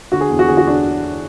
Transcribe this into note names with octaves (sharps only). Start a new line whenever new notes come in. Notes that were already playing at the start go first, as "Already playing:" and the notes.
D3 F#4
G#4
E2
F#4
D3 G#4
F#4
D4